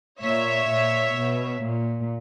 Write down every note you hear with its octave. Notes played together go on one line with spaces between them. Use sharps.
A#2 C#5 E5
A#2
B2
A#2